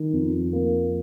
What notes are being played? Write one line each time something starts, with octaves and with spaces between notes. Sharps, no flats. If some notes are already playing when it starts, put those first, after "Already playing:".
Already playing: D#3
F2
A#3